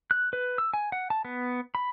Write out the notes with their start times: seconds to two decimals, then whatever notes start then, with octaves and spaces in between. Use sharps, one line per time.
0.11 F#6
0.33 B4
0.58 E6
0.74 G#5
0.92 F#5
1.10 A5
1.25 B3
1.75 B5